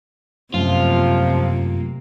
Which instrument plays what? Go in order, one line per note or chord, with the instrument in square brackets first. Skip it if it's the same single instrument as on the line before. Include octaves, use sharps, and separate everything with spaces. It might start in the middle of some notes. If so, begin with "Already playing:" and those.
[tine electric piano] F#2 F#3 A3 [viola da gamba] C3 A#3 [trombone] F3 [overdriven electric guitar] F4